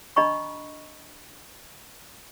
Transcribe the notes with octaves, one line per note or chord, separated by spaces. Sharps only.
D4 D#5 A#5 B5 C#6